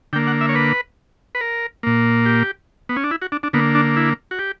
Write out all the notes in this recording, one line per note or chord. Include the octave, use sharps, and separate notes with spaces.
D3 A#3 G5
F#5
E5
C#5
B4
B4
A#4
A#2 A#3
G4
B3
C#4
D4
E4
F#4
D4
D4
D3 A#3 B3
D4
E4
F#4
G4